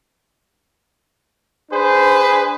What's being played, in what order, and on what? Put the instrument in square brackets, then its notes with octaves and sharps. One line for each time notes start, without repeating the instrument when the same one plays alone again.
[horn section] D4 G#4 B4 C5